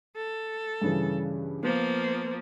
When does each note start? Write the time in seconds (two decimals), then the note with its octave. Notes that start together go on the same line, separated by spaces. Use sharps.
0.16 A4
0.81 G2 C#3 E3
1.63 F3 A#3 B3